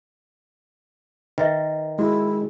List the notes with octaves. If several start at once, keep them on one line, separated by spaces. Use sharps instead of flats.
D#3 B4 D#5 E5
G#3 E4 F#4